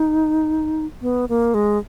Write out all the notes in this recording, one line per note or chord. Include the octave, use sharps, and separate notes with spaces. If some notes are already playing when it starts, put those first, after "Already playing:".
Already playing: D#4
B3
A#3
G#3